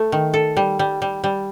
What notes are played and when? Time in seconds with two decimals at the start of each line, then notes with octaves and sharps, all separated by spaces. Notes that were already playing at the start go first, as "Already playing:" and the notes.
Already playing: A3
0.12 D#3
0.34 A4
0.57 G3
0.79 G3
1.02 G3
1.24 G3